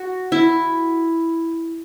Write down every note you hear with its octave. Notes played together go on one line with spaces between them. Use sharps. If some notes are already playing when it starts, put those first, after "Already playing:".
Already playing: F#4
E4